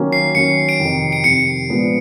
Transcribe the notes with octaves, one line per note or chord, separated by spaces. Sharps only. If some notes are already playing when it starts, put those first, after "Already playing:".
Already playing: D#3 F#3 A#3 C#4
C7
D#3 F#3 A#3 C#4 C#7
D7
F2 C3 D#3
D7
F2 C3 D#3 C#7
A#2 F3 G#3 B3 D4